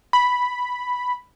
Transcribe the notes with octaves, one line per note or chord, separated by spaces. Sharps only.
B5